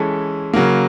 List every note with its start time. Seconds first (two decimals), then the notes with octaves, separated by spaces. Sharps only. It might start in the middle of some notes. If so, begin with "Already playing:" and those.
Already playing: E3 G#3 C#4 E4 A4
0.54 C#3 F#3 A#3